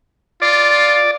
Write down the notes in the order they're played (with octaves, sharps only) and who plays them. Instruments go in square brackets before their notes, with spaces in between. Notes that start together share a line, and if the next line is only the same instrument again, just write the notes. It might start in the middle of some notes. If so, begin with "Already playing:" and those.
[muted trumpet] F4 [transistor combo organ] D5